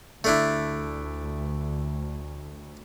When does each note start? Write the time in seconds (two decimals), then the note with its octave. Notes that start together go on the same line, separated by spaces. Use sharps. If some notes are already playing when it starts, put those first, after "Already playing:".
0.24 D2 A3 D4 E4